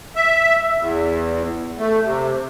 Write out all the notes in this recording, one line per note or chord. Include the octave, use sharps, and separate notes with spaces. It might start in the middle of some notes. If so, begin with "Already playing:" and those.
E5
E2
A3
C3